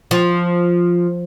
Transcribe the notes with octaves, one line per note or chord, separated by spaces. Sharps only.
F3